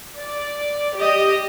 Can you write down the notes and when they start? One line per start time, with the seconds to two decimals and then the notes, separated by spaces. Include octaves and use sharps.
0.19 D5
0.95 G4 D#5